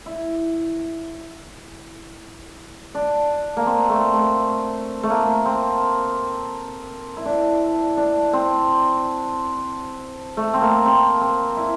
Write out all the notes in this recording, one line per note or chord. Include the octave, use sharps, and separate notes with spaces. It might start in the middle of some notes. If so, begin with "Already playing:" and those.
E4
D4
A#3
C4
A3
A3
A3
A#3
C4
E4
D4
D4
C4
A3
C4
A#3
C4
C4
E4